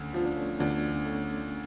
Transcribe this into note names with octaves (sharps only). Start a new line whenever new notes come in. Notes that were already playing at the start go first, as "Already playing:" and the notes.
Already playing: D2 A3 C#4
F3 B3 D4
D4
A3 C#4
D2 B3 D4
A3 C#4